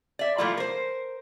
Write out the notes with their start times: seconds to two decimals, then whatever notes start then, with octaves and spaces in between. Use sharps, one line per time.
0.19 D5 E5
0.38 F3 G3 A3 A#3 E4 F4
0.57 A#4 C5